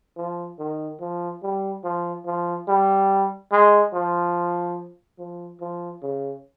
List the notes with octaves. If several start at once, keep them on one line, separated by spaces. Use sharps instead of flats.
F3
D#3
F3
G3
F3
F3
G3
G#3
F3
F3
F3
C#3